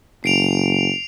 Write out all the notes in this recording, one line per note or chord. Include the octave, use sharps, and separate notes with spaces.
F#1 C7 D7 F7